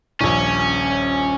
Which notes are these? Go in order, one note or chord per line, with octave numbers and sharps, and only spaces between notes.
D#1 A#1 C#4